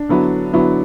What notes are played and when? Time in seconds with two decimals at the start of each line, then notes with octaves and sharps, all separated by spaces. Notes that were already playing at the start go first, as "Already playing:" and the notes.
Already playing: D4
0.09 D3 F#3 B3 E4
0.53 D3 F#3 B3 E4